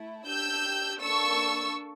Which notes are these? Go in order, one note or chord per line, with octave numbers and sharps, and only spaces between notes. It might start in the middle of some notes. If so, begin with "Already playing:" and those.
Already playing: A3 E4
D4 G4 E6 G6
A#3 D4 A4 C#6 E6